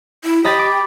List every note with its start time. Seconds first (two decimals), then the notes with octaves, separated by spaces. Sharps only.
0.24 E4
0.45 G4 D#5 B5 A6
0.59 D6